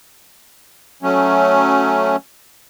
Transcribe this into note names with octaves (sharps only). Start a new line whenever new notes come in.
F#3 A3 C#4